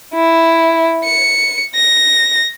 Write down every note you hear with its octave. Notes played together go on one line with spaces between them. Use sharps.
E4
C#7
A#6